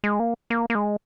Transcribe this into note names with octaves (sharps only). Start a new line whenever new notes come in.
G#3
A#3
A#3
A#3
G#3